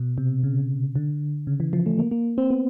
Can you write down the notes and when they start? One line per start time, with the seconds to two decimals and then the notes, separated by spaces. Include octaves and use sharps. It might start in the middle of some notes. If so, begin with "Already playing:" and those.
Already playing: B2
0.18 C3
0.43 C#3
0.96 D3
1.47 C#3
1.60 E3
1.73 F3
1.86 A3
1.99 A#3
2.11 A#3
2.38 C4
2.51 B3